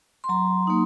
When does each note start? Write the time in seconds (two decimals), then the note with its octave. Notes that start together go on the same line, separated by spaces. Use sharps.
0.24 C6
0.29 F#3 A#5
0.67 A#3 D#4